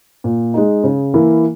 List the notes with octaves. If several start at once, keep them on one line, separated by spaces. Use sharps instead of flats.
A#2
G#3 D#4
C#3
E3 A#3 E4 A#4